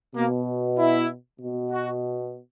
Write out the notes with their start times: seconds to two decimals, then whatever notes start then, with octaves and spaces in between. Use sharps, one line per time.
0.16 B2 A#3
0.78 E4
1.40 B2
1.71 F#4